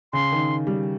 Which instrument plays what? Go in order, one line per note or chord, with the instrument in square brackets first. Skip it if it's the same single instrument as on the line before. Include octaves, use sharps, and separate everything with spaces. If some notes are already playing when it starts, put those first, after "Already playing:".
[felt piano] C#3 [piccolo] C6
[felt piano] D#3
G3